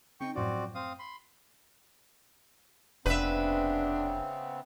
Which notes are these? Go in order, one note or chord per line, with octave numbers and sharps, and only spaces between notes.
C#3 C4 D#4 G5 C#6
F#2 A2 F3 C4 F#4 D5
C4 F5 D#6
B5 C6
F1 C#3 B3 C4 D4 B4 E5